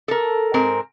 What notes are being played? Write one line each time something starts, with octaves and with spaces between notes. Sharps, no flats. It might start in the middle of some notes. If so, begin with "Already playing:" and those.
A4 A#4
G#2 C4 A#4